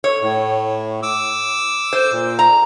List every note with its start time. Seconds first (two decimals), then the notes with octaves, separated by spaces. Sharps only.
0.04 C#5
0.22 A2
1.03 D6 E6
1.93 C5
2.12 A#2
2.39 A#5